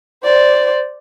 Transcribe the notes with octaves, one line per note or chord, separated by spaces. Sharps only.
C5 D5